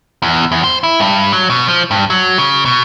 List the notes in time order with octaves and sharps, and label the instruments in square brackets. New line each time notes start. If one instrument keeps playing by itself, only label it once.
[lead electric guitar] E2
E2
C5
E4
G2
F#3
B2
F3
G2
F#3
C#3
B2